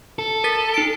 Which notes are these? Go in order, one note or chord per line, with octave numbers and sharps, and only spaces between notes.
A4
A#4 A6 B6
D#4 D7